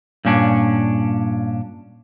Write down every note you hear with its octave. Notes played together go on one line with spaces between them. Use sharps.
G2 A#2 C#4 D4